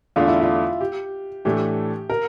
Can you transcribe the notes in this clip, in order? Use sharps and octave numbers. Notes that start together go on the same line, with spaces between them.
E2 D3 A3 D4 F4
E4
F4
G4
A2 E3 A3 D4 G4
A#4